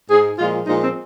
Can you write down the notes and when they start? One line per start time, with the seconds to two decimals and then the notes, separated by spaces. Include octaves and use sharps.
0.10 G#2 G#3 G#4
0.39 A#2 F3 G#3 F4
0.67 A#2 F3 G#3 D#4
0.82 C4